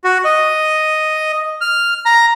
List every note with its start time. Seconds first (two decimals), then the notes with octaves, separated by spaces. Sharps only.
0.04 F#4
0.24 D#5
1.61 F6
2.06 A#5